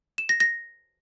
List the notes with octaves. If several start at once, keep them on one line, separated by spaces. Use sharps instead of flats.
E7
A#6
A#6